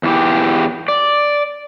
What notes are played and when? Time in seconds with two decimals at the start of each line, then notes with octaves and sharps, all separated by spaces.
0.03 E2 E3 G4
0.88 D5